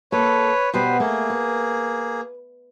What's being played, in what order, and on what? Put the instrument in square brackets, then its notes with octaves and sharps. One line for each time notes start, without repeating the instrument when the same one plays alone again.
[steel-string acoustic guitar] A#3 A4 [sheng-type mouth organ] B4 C#5
[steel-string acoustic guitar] B2 G3 B3 [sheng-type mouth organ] B4 C5
[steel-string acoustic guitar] A3 [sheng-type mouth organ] A#3 G#4
[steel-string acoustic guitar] B4